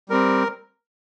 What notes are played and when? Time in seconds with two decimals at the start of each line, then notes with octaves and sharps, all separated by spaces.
0.09 G3 C4 A#4